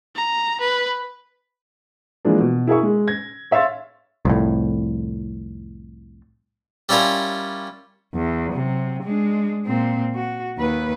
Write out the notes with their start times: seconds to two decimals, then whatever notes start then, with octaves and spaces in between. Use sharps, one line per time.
0.16 A#5
0.61 B4
2.25 E3 F3 G#3 A#3 D4
2.40 B2
2.67 E4 G#4 A#4 E5 C#6
2.83 G#3
3.07 G#6 A#6
3.51 C#5 E5 F5 C6 A6
4.25 C2 F2 A2
6.89 G3 C#4 E4 F4 A#4
8.14 E2
8.53 C3 F#3
9.03 G#3 D4
9.66 A#2 C4
10.15 F#4
10.58 D#2 B4